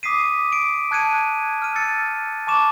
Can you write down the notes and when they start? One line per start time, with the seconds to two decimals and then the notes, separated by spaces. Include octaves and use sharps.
0.03 D6 D#6 B6 C7 D#7
0.52 D7
0.91 A5 F#6 G#6 C#7 D#7
1.62 F6 D#7
1.75 E6 A6 C#7
2.47 A5 C#6 D6 E7